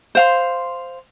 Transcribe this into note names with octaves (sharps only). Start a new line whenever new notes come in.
C5 F5 C6